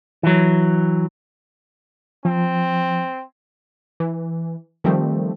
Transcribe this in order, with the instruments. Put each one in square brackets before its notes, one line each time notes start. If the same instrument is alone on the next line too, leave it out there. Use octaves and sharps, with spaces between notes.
[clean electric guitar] E3 F#3
[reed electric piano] F3 [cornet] C4
[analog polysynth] E3
D#3 F3 G3 A3 C4